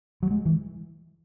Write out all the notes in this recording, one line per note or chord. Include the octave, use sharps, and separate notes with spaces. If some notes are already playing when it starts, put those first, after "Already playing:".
F#3
G#3
E3